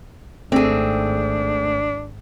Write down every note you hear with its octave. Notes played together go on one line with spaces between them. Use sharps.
G#1 A3 C4 D4 G#4